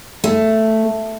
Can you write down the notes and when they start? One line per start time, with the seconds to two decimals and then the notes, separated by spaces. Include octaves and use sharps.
0.24 A3